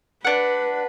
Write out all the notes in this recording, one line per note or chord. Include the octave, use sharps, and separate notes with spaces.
D4 B4 F#5